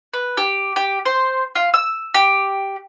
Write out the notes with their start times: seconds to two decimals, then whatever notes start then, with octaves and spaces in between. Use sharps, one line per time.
0.14 B4
0.37 G4
0.76 G4
1.06 C5
1.56 F4
1.74 E6
2.14 G4